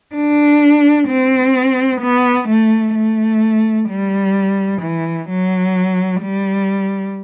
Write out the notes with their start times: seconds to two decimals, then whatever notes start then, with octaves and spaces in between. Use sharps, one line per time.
0.15 D4
1.08 C4
2.01 B3
2.48 A3
2.95 A3
3.89 G3
4.82 E3
5.29 F#3
6.22 G3